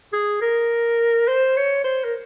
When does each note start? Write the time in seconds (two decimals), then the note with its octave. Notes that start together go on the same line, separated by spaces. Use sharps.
0.13 G#4
0.42 A#4
1.28 C5
1.57 C#5
1.84 C5
2.04 A#4